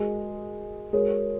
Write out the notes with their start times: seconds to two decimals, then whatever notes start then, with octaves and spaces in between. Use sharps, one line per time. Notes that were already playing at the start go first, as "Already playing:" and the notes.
Already playing: G#3 F#4 G#4 A#4 D#5 G#5
0.93 G#3 F#4 G#4 A#4 C#5